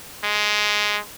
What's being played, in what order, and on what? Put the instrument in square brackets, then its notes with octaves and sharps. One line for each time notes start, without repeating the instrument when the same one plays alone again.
[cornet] G#3